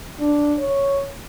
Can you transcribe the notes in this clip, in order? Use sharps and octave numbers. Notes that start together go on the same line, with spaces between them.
D4
C#5